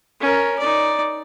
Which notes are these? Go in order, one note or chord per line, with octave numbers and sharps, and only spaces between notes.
C#4 A#4
D#4 D5